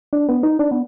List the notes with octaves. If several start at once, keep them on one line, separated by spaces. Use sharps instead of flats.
D4
B3
D#4
D4
B3